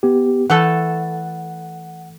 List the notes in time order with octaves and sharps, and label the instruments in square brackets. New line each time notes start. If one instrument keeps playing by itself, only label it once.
[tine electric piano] B3 G4
[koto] E3 A3 A4 [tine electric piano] F#5